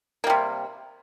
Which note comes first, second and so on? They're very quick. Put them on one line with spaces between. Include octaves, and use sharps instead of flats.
A#3 G3 C3